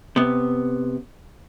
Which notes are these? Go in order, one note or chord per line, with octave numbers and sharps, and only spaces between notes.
C3 B3